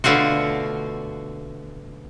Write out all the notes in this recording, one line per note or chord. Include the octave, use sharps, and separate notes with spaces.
B2 D3 A3 F4 F#4